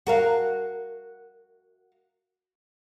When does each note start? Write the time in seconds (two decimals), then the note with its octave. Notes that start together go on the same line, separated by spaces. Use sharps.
0.07 F#4 A#4 F5